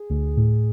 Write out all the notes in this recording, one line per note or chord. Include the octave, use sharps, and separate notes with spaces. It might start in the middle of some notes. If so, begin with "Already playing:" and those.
Already playing: G#4
D2
A2